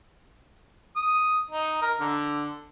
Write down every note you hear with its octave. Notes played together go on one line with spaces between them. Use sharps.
D#6
D#4
A#4
D3